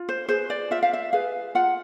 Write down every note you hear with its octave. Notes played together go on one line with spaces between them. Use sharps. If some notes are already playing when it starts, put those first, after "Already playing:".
Already playing: F4
C5
G#4 B4 C5
D5
F4 E5
F5
E5
G#4 B4 F5
F4 F#5